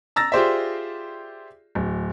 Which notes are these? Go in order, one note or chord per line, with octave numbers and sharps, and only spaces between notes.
A#5 E6 A6 A#6
F4 G4 G#4 C5 D5 E5
D1